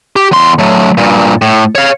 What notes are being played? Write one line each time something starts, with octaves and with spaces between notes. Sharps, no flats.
G4
E2 C6
F#3 A3
G2 A#2
A2
C#5 F5